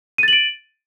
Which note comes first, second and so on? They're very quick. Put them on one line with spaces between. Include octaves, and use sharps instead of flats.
D#7 A6 F#7 D7